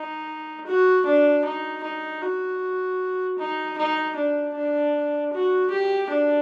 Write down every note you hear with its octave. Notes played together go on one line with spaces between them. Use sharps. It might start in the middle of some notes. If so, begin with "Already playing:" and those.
Already playing: D#4
F#4
D4
D#4
D#4
F#4
D#4
D#4
D4
D4
F#4
G4
D4